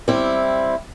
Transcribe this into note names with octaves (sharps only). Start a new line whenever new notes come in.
G3 C4 E4